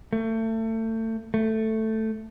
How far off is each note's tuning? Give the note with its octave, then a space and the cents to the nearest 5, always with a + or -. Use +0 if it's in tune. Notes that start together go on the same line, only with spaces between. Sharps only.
A3 +30
A3 +5